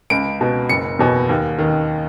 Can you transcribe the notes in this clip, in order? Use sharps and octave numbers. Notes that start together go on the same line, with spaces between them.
C#2 D7
B2
F#1 C#7
E2 B2
D#2
D#3